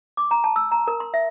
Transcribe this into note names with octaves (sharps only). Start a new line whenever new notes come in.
D6
A#5
A5
E6
A#5
A#4
C6
E5